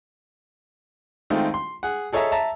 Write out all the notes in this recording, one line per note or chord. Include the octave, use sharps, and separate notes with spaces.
D#3 G#3 A3 C4 F4
C6
G#4 F#5
G#4 A4 C#5 D#5 E5 A#5
E5 A5 A#5